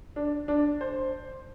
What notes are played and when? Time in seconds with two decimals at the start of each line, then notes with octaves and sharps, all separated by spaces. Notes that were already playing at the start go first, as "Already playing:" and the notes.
0.16 D4
0.48 D4
0.81 C5